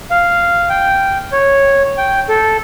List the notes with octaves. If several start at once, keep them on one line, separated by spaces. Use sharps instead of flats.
F5
G5
C#5
G5
A4